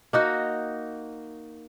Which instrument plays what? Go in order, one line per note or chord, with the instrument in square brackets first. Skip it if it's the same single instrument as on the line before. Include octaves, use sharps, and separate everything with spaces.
[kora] A#3 D#4 F#4